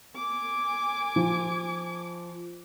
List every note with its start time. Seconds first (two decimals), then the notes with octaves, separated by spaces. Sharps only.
0.16 G#5 D6
1.16 F3